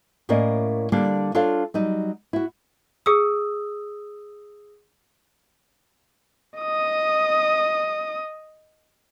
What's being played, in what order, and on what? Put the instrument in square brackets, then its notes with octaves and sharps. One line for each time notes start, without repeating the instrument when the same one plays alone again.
[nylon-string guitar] A2 A#3 C#4 A#4 D5 D#5
D3 G3 A#3 D4
D4 F4 A4 C#5 F5
F#3 G3 D#4
E4 F#4
[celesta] G#4 D#6 E6
[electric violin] D#5 D#6